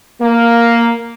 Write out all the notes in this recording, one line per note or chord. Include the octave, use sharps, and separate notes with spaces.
A#3